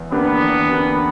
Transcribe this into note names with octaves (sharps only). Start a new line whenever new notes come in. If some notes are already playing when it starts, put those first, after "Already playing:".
Already playing: E2
D3 A#3 B3 D4 G4
E2
D3 A#3 D4 G4